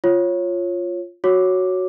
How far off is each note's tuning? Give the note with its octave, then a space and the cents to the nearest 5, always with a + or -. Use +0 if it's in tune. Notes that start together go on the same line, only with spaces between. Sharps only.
F4 +0 C#5 -15
F#4 +0 C#5 +0 D6 +0